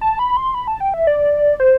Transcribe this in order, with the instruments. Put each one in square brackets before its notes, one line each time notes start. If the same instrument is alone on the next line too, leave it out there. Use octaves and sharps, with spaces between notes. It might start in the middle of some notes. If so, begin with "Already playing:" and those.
[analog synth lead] A5
B5
C6
B5
A5
G5
E5
D5
C5